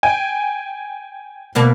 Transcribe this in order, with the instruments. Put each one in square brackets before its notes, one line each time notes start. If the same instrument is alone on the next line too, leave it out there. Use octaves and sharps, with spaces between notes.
[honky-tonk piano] G5 G#5
[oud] D2 B2 A#3